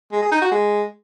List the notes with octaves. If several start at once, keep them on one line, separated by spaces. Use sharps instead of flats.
G#3
G#4
D#4
F#4
G#3